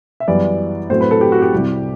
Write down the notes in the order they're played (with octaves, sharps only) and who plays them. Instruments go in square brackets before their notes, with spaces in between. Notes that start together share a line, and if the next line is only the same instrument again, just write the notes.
[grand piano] E5
F#2 E3 G3 B3 D5
A2 F#3 A3 C4 C5
B4
A4
G4
F#4
G4
C2 C3 G3